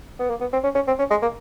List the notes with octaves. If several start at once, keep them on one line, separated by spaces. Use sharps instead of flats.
B3
A#3
B3
C4
C#4
C#4
C4
C#4
G#3
A#3